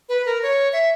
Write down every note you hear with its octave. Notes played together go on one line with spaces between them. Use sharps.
B4
A#4
C#5
E5